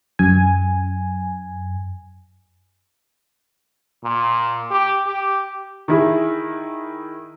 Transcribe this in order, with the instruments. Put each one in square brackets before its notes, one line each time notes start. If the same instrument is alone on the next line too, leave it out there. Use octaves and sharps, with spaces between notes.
[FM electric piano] F#2 G#5
[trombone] A#2
G4
G4
[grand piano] D#3 E4 G#4